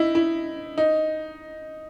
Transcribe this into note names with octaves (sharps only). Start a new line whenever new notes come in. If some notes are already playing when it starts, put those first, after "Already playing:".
Already playing: D#4 E4
E4
D#4